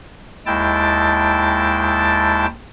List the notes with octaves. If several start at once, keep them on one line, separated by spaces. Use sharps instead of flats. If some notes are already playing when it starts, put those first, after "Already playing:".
D#2 G#3 E4 G5 A5 A6